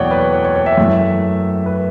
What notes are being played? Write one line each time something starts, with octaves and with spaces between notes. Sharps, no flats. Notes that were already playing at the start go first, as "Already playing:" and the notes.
Already playing: E2 B2 F#3 A3 C#5 D5 F#5 G5
B4
C#5
C#5
C#5
E5
F#2 E3 A3 E4
B4